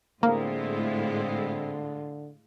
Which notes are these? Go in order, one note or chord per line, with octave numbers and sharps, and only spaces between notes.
A2 D3 G#3 A#3 C4 E4 F4